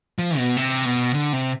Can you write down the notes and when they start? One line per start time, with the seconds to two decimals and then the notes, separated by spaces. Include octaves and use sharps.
0.19 F3
0.38 B2
0.57 C3
0.85 B2
1.14 D3
1.33 C3